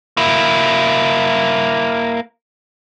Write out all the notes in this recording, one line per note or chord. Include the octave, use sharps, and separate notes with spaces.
A#3 E4